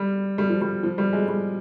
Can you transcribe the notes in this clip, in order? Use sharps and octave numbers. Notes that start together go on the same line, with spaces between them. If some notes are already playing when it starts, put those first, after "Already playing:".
Already playing: G3
G3
F3
G3
F3
G3
G#3
G3